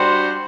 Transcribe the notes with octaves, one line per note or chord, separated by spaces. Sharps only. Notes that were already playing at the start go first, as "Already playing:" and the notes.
Already playing: G3 D4 F#4 C5 C6